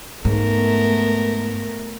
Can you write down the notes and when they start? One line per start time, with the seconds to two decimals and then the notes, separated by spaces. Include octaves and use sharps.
0.25 G#2 A3 B3 A#4